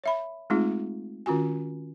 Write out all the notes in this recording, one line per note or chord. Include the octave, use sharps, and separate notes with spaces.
C#5 E5 B5
G#3 A3 C4 D#4 F4 G#4
D#3 C#4 F4 F#4 G#5